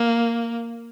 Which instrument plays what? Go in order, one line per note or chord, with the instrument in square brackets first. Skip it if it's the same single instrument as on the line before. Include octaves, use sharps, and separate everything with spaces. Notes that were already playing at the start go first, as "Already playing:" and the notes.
Already playing: [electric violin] A#3